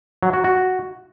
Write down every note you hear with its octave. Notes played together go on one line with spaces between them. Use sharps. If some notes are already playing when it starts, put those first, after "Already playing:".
F#3
F#4
F#4